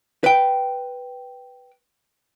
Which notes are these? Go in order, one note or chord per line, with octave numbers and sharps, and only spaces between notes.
B4 G5